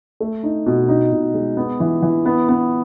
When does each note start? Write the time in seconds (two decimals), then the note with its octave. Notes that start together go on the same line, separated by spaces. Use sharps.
0.20 A3
0.43 D#4
0.66 B2
0.88 D#4
1.12 B2
1.34 G#3
1.57 B3
1.80 E3
2.02 E3
2.26 B3
2.49 B3